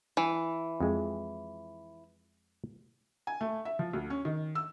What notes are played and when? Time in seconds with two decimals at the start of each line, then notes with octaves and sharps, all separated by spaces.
0.17 E3
0.80 F2 G#3
3.27 G#5
3.41 A3
3.65 E5
3.79 F3
3.93 D2
4.10 C#4
4.25 D#3
4.55 E6